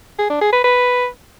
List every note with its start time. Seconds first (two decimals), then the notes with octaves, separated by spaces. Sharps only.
0.19 G#4
0.30 D4
0.41 G#4
0.53 B4
0.64 B4